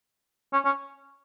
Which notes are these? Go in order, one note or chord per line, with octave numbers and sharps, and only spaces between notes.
C#4
C#4